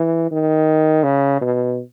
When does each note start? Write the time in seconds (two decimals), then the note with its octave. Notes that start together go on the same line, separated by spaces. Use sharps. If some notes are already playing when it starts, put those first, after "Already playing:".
Already playing: E3
0.31 D#3
1.04 C#3
1.41 B2